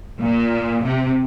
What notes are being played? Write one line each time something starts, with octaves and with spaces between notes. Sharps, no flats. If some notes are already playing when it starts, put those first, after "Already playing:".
A#2
C3